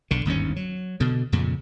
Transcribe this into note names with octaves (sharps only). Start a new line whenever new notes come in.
B1 D3
G1 D#2 G#2 C#4
F#3
B2 D3
F2 A#2 C#3